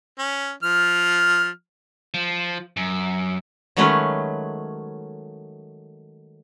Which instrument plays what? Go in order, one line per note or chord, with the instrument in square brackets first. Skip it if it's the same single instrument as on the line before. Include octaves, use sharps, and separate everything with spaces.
[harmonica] C#4
F3 F6
[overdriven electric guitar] F3
F#2
[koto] D#3 F#3 G#3 A3 C#4 B4